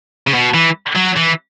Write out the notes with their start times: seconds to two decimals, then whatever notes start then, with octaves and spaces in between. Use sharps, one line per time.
0.27 C#3
0.33 B2
0.54 E3
0.95 F#3
1.16 E3